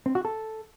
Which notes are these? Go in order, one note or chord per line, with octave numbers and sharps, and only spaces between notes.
C4
F#4
A4